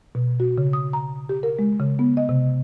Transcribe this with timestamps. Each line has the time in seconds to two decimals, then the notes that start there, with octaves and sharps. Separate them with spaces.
0.15 B2
0.40 F#4
0.58 C#3
0.73 D#6
0.93 A#5
1.29 G4
1.43 A#4
1.59 G#3
1.80 C#3
1.99 B3
2.17 D#5
2.29 C3